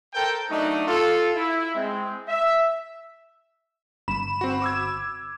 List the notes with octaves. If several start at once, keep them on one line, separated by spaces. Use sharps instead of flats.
A4 A#4 C5 G5
F#3 A3 D4 D#4
F4 A4
E4
G#3 C4
E5
G1 B5 E7
C4 F#4
D6 E6 G#6